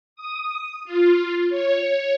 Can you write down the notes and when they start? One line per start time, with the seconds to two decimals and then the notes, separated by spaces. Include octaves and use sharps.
0.16 D#6
0.85 F4
1.49 C#5